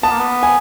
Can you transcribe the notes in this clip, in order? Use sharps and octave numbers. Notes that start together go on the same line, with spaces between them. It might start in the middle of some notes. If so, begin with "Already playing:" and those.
B3 A5
A#3
B3
G#5